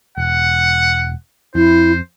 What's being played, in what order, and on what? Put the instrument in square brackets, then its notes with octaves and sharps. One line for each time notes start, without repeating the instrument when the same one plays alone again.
[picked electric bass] E1 [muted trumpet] F#5
[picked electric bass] F2 [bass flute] E4 [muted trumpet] C5